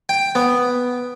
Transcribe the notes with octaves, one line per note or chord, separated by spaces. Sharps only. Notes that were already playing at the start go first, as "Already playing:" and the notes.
G5
B3